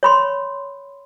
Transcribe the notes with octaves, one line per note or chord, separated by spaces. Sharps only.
C#5 B5 C6